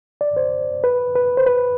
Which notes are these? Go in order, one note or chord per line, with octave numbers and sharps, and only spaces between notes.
D5
C5
B4
B4
C5
B4